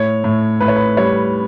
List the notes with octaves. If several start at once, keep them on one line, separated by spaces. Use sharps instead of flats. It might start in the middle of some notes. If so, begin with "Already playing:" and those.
Already playing: A2 C#5
A2
A2 B4
C#5
B4
G3 C#5